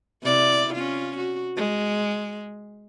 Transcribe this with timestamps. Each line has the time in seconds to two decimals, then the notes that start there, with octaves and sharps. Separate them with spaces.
0.23 C3 E4 D5
0.74 C#4 F4
1.17 F#4
1.56 G#3